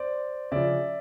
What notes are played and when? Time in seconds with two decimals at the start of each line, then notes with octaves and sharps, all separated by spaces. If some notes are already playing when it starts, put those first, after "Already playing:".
Already playing: C5 D5
0.52 C#3 F3 D5 E5